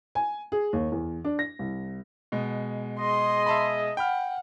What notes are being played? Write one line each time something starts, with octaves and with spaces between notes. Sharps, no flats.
G#5
G#4
D#2
E2
D4
A#6
C2
B2 G#3
G#4 D#5 C6
E5 A5 B5
F#5 G5 B5 F6